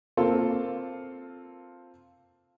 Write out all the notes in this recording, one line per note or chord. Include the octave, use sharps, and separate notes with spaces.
A#3 C4 F4 A4